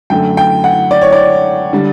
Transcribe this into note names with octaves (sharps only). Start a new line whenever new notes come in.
F#2 D3 A3 G5
G5
F#5
D5
C#5
D5
D3 G3